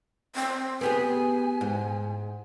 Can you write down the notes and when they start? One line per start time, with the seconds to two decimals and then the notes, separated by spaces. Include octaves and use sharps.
0.35 C4
0.81 B3 G4 G#4 G#5
1.61 G#2